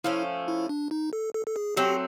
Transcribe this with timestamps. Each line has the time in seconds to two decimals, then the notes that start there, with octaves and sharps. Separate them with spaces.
0.04 F3 A3 C#4 E4
0.48 E4
0.69 D4
0.91 D#4
1.13 A4
1.34 A4
1.47 A4
1.56 G#4
1.77 F#3 A3 C4 G4